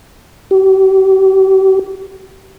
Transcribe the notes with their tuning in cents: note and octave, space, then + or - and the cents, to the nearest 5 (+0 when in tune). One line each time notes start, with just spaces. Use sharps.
G4 -40